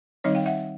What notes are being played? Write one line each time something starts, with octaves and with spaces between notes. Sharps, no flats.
D#3 G3 C4 D#4 C#5 D#5
F5 G5
E5 F#5